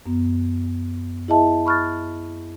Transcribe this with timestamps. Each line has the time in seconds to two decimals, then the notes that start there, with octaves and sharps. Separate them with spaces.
0.06 F#2 B3
1.28 E4 G#4 D#5 E5 A5
1.66 B5 C#6 F6 F#6 A6